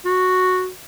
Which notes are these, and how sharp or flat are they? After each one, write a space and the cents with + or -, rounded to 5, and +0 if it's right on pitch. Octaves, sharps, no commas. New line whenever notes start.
F#4 -5